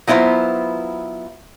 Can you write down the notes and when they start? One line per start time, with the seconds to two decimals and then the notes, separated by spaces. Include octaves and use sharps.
0.07 F#3 B3 E4 F4 C5